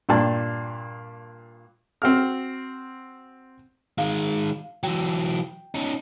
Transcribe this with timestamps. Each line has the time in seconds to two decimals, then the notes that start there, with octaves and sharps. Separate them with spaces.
0.09 G2 A#2 D4 G5 A5
2.02 C4 F#4 F6
3.98 D#3 G#3 F5
4.83 E3 F#3 G5
5.74 C#4 D#4